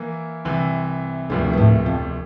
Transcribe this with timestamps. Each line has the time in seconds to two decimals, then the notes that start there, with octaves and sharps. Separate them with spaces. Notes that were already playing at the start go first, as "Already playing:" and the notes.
Already playing: E3 A#3 E4
0.45 C2 C3 E3
1.29 E1 D2 G2 C3 F3
1.53 G2
1.58 A2
1.86 F2